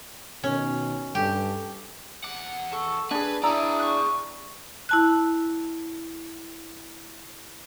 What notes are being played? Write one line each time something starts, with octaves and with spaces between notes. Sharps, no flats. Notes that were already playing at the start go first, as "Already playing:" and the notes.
B2 D#3 C#4
G2 G4 A4
E2 F#5 D6
A4 C#6
D4 G#4 B4 G#5
D4 E4 G#4 D5 A#5 D#6 E6
C#6 F#6
E4 A5 F#6